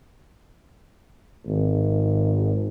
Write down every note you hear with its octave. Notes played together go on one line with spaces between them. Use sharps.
G#1